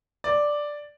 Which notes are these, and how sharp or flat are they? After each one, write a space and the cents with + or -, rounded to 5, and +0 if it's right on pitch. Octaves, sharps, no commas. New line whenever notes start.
D5 +0